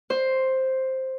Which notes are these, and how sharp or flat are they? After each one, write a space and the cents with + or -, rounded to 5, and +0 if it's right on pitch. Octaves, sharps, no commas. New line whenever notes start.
C5 +5